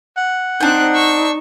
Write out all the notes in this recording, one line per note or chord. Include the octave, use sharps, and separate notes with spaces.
F#5
C4 D4 D#4 C5 F#6
C#6 E6